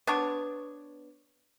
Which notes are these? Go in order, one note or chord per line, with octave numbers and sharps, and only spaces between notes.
B3 D4 C#5